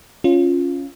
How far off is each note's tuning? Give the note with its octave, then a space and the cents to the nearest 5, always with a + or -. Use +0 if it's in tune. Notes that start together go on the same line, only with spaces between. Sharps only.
C#4 +0 F4 +0